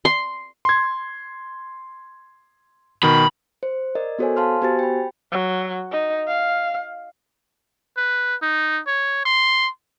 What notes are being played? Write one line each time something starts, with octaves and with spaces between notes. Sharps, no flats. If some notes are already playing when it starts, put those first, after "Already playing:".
C6
C6 G#6
B2 D#3 B5
C5
A#4 D5 D#5
B3 F#4 A4 C5 C#5 G#5
F5 A5 C6 F6
B3 F#4 G4 C5 G#5 A6
G5 B5
F#3
D#4
F5
B4
D#4
C#5
C6